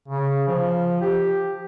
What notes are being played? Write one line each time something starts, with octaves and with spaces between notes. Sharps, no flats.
C#3
F3
G4